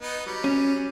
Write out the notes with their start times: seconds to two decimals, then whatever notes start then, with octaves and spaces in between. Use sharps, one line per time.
0.01 B3 D#4
0.26 F#3 G3
0.44 C#4